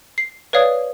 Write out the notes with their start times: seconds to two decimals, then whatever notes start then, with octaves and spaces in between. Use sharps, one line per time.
0.18 C7
0.53 B4 C#5 D5 F5 D#6 G#6